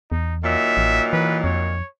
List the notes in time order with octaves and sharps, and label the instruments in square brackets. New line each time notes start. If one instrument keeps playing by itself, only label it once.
[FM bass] E2 [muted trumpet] D#4
[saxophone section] A#2 D#3 F#3 [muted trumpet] E5
[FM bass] A1
[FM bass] E3 [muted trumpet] B4
[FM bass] F2 [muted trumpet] C#5